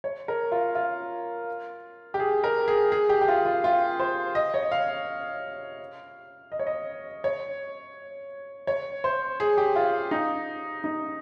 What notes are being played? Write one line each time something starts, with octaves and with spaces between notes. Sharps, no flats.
C#5
A#4
F4
F4
G4
G#4
A#4
G#4
G#4
G4
G4
F4
F4
F4
C5
D#5
C#5
D#5
F5
D#5
C#5
D#5
C#5
C#5
C5
G#4
G4
F4
D#4
D#4